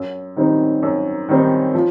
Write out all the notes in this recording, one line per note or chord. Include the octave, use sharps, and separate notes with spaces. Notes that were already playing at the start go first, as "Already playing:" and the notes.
Already playing: F#2
D#3 G3 C4 D#4
F#2
D#3 G3 C4 D#4
F3